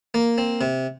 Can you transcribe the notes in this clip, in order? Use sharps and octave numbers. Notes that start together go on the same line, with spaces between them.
A#3
C4
C3